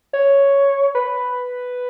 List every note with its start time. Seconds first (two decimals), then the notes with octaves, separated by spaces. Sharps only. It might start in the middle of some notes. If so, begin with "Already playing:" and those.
0.13 C#5
0.95 B4